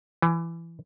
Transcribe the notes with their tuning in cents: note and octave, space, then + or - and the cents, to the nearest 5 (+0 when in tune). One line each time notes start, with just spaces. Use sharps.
E3 +20